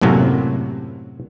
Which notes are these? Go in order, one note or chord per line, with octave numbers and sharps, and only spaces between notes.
F#2 A2 C3 F#3 A#3